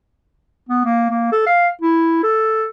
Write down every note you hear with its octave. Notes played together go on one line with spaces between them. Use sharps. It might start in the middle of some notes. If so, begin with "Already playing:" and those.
B3
A#3
A#3
A4
F5
E4
A4